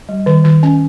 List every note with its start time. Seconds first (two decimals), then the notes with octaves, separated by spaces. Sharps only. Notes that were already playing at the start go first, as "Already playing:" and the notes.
0.09 G3
0.26 D#3
0.45 D#3
0.63 C#4